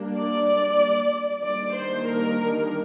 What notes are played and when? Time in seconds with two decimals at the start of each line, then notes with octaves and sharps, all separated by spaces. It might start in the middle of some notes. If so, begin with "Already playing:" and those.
Already playing: G3 A#3 D4
0.16 D5
1.44 D#3 G3 A#3 D4 D5
1.76 C5
2.08 A#4